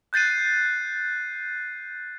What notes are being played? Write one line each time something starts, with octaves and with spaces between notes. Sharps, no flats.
F#6 G6 A6 C7 D#7